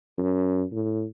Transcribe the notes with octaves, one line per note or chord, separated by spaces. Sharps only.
F#2
A2